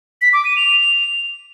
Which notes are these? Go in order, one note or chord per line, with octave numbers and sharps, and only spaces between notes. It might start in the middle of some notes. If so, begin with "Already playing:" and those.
B6
D6
D#7
F7